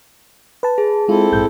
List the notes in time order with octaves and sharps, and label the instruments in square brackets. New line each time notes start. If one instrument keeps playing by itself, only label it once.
[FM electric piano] B4 A5
[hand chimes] G#4
[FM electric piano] G#3 F4 [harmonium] C4 E4 A4
[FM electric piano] A#1 G#2 G6